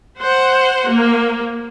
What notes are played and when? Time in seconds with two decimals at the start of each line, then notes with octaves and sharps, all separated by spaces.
0.19 C5 F#5
0.89 A#3